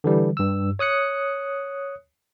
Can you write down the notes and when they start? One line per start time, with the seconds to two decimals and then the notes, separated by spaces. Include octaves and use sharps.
0.04 D3 E3 G3
0.37 G2 E6
0.79 C#5 D#6 F#6 C#7